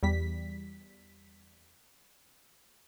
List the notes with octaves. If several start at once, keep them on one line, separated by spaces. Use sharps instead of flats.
E2 G3 B6